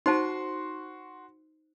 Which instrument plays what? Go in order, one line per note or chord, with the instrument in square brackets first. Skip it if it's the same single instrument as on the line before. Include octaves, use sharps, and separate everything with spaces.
[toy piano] D#4 C5 A5 [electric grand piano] F#4 C6